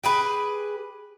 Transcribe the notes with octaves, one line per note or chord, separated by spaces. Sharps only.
G4 G#4 B4